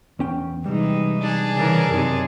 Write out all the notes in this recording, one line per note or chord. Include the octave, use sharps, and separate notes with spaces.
E2 C#4 G5
C3 E3 G3 G#3 D#4
D4 G#4
C#3 E3 A#4
F#2 C3 D#4